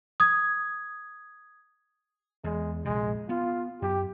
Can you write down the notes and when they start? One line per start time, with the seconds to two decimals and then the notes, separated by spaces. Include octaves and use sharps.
0.20 D#6 G#6
2.44 E2 G#3
2.85 A#1 C3 G#3
3.29 B3 F4
3.82 F#2 G4